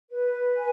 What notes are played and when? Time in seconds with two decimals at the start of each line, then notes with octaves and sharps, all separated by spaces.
0.10 B4
0.55 G#5